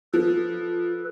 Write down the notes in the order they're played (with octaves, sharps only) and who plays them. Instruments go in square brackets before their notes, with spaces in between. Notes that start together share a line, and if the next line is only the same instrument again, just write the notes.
[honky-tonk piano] F3 [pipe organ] A4 B4